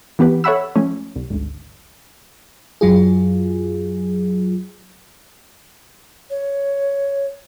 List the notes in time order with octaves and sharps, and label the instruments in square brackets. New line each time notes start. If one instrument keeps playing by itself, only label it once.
[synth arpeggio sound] E3 B3 G4 B4
A4 C#5 E5 F#5 B5 E6
F3 A3 C#4
C2
G#1 D2
[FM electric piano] F#2 F#3 F4 G#4
[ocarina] C#5